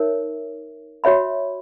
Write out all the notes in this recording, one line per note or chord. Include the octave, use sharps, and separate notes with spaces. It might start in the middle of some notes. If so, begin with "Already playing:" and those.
Already playing: D#4 A#4 C#5 E5
F#4 C#5 E5 B5